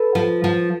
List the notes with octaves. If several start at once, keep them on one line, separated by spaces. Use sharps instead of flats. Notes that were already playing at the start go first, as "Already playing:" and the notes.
Already playing: A4 B4
F3
F3